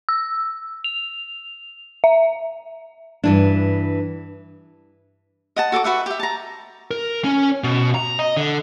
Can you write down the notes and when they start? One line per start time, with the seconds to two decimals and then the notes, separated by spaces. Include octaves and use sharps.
0.09 E6
0.84 F7
2.04 E5
3.24 G2 E3 D4
5.56 D#5 F#5 A5
5.72 F#4 A4 A5 D6
5.84 F#4 B4 E5 F#5
6.06 G4 E5
6.19 A5 A#5
6.91 A#4
7.24 C#4
7.64 B2
7.94 A#5
8.19 D#5
8.37 D3